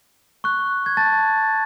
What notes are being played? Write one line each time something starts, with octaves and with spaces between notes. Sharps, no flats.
C#6 F#6
G#6
A5 A6